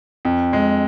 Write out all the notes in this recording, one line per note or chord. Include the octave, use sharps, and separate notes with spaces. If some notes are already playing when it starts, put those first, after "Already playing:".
F2
G#3